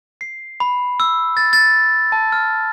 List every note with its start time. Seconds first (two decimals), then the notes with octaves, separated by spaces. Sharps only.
0.21 C7
0.60 B5
1.00 E6
1.37 A6
1.53 A6
2.12 A5
2.32 F6